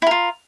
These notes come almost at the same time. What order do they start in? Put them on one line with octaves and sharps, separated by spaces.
E4 A#4 F4